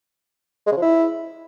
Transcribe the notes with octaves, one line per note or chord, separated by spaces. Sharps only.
G#3
C#3
F3
E4